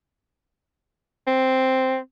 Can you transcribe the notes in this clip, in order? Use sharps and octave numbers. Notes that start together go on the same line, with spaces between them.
C4